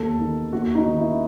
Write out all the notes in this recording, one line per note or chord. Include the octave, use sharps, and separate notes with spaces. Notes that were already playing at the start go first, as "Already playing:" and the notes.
Already playing: D#2 A4
D#3
D#2 F#4
D#4
D#3
E4